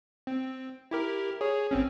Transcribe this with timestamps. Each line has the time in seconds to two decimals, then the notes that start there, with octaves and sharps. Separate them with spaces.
0.27 C4
0.91 E4 G4 A#4
1.41 G#4 C#5
1.71 G#1 C4 C#4